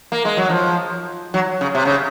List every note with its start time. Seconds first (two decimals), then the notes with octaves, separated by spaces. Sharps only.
0.12 A#3
0.25 G#3
0.37 F#3
0.49 F3
1.34 F#3
1.61 C#3
1.75 C3
1.85 C#3